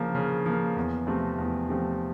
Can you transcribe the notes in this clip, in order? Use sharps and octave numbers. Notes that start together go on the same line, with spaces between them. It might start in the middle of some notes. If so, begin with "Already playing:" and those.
Already playing: C#3 F3 A#3
C#3
F3 A#3
E2
C3 F3 A3 C4
E2
C3 F3 A3 C4